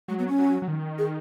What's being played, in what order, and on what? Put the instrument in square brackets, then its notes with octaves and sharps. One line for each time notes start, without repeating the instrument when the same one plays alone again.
[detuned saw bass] F#3 [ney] G#3
[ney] B3
C#4
[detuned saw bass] F#3
F#3
D#3
[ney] G#4